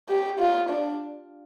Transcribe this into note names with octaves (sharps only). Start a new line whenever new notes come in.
G4
F4
D4